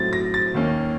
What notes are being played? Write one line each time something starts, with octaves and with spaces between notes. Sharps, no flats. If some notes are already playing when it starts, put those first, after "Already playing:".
Already playing: A2 F#3 C4 A6
A#6
A6
D#2 D#3 A#3 C#4